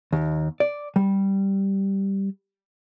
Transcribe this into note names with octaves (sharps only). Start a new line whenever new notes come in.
D#2
D5
G3